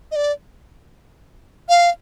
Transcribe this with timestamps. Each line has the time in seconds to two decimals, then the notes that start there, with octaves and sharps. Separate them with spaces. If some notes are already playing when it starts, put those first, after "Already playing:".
0.12 D#5
0.16 D5
1.69 F5